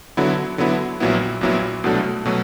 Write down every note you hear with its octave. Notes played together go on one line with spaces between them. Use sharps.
D3 F#3 B3 E4
D3 F#3 B3 E4
A#1 A#2 F#3 B3 E4
A#1 A#2 F#3 B3 E4
C2 B2 F#3 A3 D4
B2 F#3 A3